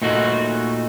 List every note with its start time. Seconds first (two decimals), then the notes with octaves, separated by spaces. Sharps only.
0.02 A#2 A3 D#4 F#4